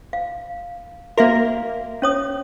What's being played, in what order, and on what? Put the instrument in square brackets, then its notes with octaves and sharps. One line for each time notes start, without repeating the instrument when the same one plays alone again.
[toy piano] F5
[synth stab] A#3 A#4 [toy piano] F#4 E5 F5
[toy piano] C#4 C#5 D#6